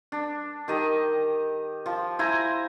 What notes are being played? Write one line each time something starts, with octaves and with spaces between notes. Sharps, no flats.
D4
D#3 G4 D#5
F3
E4 C5 G#5 A#5